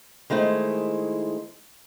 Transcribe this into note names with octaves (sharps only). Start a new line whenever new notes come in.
D#3 G#3 A3 E4 C5